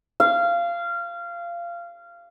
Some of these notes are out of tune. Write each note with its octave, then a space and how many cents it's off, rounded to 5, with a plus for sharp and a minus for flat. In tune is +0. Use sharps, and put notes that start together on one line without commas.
F5 -20